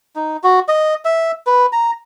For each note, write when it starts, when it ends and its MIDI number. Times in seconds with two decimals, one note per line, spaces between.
0.16 0.37 63
0.43 0.60 66
0.68 0.94 75
1.05 1.32 76
1.47 1.66 71
1.73 1.91 82